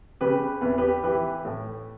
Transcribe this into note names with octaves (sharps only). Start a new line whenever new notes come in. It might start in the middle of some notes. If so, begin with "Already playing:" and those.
C#3 G4 B4
E2 B4
G4 B4
E3 G4 B4
A2